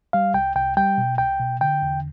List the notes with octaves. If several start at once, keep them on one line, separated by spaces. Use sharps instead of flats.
G3 F5
C2 G5
C2 G5
G3 G5
B2
C2 G5
B2
D3 G5
E2